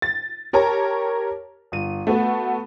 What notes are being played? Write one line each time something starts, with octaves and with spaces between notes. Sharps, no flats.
A6
G4 A#4 C#5 A5 A#5
G1 D#7
A3 B3 F#4